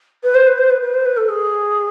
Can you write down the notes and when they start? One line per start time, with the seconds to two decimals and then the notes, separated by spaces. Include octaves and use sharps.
0.23 B4
0.35 C5
0.47 B4
0.58 C5
0.70 B4
0.81 B4
0.94 C5
1.05 B4
1.17 A4
1.29 G#4